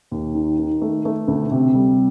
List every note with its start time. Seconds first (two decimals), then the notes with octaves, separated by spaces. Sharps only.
0.11 D#2
0.35 D#3
0.58 D#3
0.82 A3
1.05 A3
1.28 D2
1.51 C3
1.75 G3